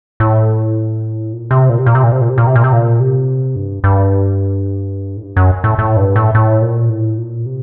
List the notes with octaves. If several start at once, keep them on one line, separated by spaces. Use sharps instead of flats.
A2
A#2
C3
A#2
C3
A#2
C3
A#2
C3
A#2
C3
A#2
C3
A#2
C3
A#2
C3
G2
G2
A2
G2
F#2
A2
A2
G2
A2
A2
A#2
A2
A#2
C3